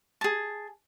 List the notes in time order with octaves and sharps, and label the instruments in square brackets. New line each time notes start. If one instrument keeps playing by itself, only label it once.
[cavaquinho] G#4 A5